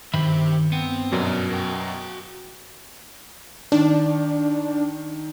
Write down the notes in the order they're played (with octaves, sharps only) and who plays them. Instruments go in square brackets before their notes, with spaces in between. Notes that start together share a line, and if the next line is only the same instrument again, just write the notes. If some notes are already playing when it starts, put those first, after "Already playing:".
[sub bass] G2 [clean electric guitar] D#3 B5 [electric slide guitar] G4 C5 E5
[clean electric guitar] B3 [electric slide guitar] C4
[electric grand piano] F#2 B2 F#3 [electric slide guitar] D4 A#4 D5
[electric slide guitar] F#4 G5
[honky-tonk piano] D#3 [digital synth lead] D4